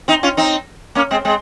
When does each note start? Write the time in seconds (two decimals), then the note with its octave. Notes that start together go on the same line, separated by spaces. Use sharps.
0.08 C4 D#4
0.23 C#4 F4
0.37 C4 D#4
0.95 A#3 C#4
1.11 G#3 C4
1.25 G#3 C4